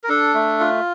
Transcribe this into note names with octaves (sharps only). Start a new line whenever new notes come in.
A#4
D4 A4
A3
F4